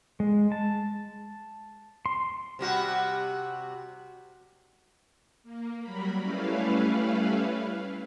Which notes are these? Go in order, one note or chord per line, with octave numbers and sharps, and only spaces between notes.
G#3
A5
C6
C3 G3 F#4
A#3
F#3 G3 A#4 B5
G3 A3 C#4 E4 B4 F5